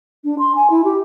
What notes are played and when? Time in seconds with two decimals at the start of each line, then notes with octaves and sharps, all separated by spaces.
0.24 D4
0.39 C6
0.55 G#5
0.70 E4
0.85 G4